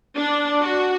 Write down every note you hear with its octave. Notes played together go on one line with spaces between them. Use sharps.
D4
F#4